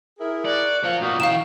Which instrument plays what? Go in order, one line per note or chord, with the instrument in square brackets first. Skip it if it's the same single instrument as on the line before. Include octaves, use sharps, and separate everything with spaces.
[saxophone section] E4 G#4 A#4
[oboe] F#4 [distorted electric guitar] D5
[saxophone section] F3 A#3 [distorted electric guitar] C#5 F#5
[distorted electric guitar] A#2 B3 [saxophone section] F#3 A#3 F#4 [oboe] D#4
[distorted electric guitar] E3 G5 [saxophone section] C#4 [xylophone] F5 E7